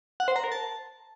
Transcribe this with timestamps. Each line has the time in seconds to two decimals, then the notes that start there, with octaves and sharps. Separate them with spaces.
0.20 F#5
0.28 C5
0.36 A#5
0.44 A#4
0.52 A5